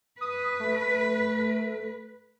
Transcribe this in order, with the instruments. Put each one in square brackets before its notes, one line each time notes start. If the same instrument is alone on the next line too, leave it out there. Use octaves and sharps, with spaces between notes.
[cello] B4 [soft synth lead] D#6
[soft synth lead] A3